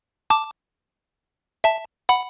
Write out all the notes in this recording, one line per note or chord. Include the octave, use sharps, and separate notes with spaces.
A5 D6
E5 A5
F#5 B5